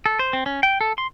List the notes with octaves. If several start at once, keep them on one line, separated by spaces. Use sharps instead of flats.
A4
C5
C4
C#4
G5
A4
C6